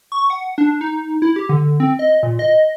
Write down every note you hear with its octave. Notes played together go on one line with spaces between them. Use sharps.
C#6
F#5
D4
D#4
E4
G4
D3
C4
D#5
A#2
D#5